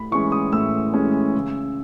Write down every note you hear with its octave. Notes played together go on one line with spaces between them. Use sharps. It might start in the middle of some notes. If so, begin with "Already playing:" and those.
Already playing: A2 B5
E3 G#3 C#4 C#6
D#6
A2 E6
E3 G#3 C#4
C#3